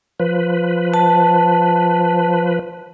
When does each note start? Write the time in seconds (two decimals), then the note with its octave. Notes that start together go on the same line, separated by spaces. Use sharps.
0.20 F3 B4
0.94 A5